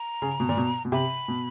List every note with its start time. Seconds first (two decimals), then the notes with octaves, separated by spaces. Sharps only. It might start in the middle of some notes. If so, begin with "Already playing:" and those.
Already playing: A#5
0.22 C#3
0.40 B2
0.49 A#2
0.57 B2
0.85 B2
0.92 C3 B5
1.28 B2